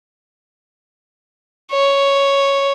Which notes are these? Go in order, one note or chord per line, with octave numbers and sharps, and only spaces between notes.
C#5